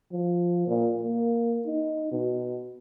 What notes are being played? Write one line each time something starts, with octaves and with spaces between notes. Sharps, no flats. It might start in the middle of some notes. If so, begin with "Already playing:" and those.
F3
A#2
A#3
D#4
B2